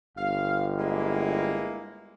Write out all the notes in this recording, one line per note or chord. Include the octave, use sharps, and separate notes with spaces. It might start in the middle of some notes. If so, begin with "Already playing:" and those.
G1 F5
G#3 A#3 E4